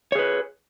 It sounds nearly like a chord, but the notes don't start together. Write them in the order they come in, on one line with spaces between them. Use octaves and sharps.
C#5 G#4 B4